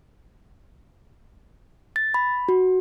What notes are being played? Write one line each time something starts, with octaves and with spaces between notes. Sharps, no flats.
A6
B5
F#4